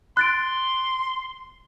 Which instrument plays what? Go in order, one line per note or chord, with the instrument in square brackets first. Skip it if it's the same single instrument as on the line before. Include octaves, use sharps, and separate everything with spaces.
[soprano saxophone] C6 [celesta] F#6 A6 D7